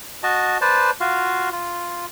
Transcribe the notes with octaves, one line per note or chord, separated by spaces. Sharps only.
F#4 D#5 A5
B4 C5 D5 A5
F4 F#4 F5
F4